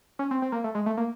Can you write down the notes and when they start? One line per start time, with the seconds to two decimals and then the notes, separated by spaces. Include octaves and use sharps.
0.19 C#4
0.31 C4
0.42 C4
0.52 A#3
0.64 A3
0.75 G#3
0.86 A3
0.97 A#3